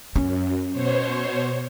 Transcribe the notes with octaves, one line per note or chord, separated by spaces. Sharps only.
F#2 C#4
B2 C5 C#5